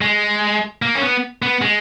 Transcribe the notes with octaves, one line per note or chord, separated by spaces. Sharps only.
G#3
A#3
C#4
B3
B3
G#3